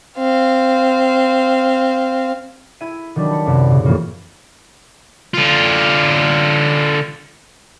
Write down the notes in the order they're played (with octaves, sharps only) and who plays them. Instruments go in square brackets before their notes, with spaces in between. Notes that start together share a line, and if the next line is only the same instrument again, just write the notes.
[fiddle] C4 F5
[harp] E4 E5 G#6 D#7
D#3 F#3 G3 D4
B5 C#7
C2 F#2 C3
A#2 C#3
F2 A2 E3 A#3 E4 C#5
[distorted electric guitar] D3 F4